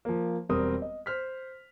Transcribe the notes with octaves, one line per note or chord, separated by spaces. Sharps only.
F3 A#3
E1 G3 C4 A#4 D#6
D#5
C5 F6 B6